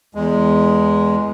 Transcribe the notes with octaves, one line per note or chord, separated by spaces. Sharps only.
E2 G#3